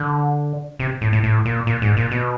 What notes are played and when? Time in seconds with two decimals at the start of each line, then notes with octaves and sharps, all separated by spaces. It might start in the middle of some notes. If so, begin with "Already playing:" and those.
Already playing: D3
0.79 C3
1.01 A2
1.13 A2
1.23 A2
1.45 A#2
1.67 A#2
1.82 G#2
1.97 A#2
2.11 B2